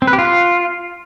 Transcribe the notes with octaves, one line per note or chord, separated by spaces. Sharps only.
C4
B4
G4
F4